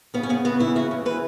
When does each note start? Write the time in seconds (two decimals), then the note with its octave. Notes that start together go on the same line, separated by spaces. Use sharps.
0.14 C#3 B3
0.23 C#4
0.29 C#3 B3
0.45 C#3 B3
0.59 E3 E4
0.75 C#3 F#4
0.91 C#3
1.05 E3 B4